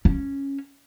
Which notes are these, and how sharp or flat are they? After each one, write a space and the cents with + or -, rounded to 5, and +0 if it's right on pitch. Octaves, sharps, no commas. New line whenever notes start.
C#4 -5